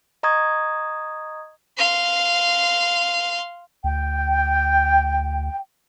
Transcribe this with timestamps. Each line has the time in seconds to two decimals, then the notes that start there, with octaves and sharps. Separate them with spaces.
0.23 D#5 A#5 C#6 D#6 G#6
1.78 F5 C6
3.84 D2 G5